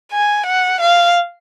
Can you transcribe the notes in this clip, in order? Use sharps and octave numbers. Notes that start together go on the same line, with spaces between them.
G#5
F#5
F5